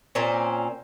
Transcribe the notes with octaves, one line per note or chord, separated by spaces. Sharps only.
A#2 C4 C#4